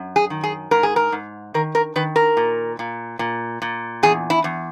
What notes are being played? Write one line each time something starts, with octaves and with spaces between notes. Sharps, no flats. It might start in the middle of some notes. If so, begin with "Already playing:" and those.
Already playing: F#2
G#4
D#3
G#4
G#2 A#4
G#4
A#4
G#2
D#3 A#4
A#4
D#3 B4
A#4
A#2
A#2
A#2
A#2
E2 G#4
E4
E2